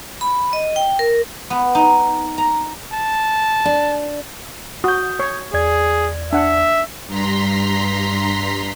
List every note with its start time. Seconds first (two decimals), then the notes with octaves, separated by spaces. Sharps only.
0.21 B5
0.53 D#5
0.76 G5
0.99 A#4
1.50 B3
1.75 D#4
2.38 A#5
2.92 A5
3.65 D4
4.84 F#4 D#6 G6
5.19 C#5
5.54 E2 G#4 D5 G#6
6.33 D4 E5 F#5
7.07 G2 A#5 C6 B6